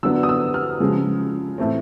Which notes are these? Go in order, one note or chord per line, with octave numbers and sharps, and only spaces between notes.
D3 F#3 B3 D4 E6
D#6
E6
F6
C#3 F3 G#3
A2 E3 A3 C4